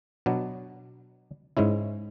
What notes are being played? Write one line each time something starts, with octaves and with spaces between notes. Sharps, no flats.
B2 F#3 B3 D4
G#2 G#3 C#4 E4